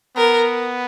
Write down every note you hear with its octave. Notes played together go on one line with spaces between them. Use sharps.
B3 A#4